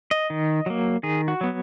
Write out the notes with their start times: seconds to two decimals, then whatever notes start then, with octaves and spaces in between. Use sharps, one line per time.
0.11 D#5
0.30 D#3
0.66 F#3 A#3
1.03 D#3 G#4
1.28 F#4
1.41 F#3 B3